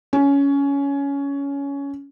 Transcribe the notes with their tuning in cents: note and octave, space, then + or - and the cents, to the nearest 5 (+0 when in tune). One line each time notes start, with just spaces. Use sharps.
C#4 +15